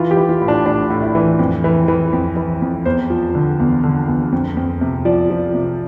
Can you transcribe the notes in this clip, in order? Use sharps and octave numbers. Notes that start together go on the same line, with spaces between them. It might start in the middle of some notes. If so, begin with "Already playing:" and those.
Already playing: E3 F4
G4
E3
F4
A2
D4
A2 D4
A2
E4
E3
F2
E3
E3
F2
E3
F2
E2 C5
F3
D3
E2
D3
E2
F2
F2
C3
F3 D5
F3
C3